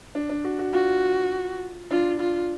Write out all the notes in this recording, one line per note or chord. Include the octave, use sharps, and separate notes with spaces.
D4
D4
F#4
F#4
F4 F#4
D4 F4
F4